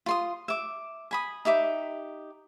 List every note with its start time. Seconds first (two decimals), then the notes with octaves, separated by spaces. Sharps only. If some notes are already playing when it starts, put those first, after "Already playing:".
0.06 F4 C6 D#6
0.48 E5 D6
1.11 G#5 B5 D#6
1.45 D#4 G4 E5 D6